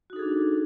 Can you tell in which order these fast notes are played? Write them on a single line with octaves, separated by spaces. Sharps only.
F#4 D#4 A4 G#4 D4